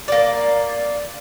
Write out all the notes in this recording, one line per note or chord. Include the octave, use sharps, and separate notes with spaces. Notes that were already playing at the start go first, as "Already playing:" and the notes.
A#3 D5